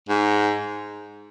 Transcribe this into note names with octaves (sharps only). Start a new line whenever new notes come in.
G#2